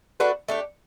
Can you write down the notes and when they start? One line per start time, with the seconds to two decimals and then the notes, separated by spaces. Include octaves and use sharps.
0.20 A3 D4 F#4 B4
0.48 A3 D4 G4